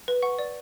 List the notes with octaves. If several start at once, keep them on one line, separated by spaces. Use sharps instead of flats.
B4
F#5 C#6
D5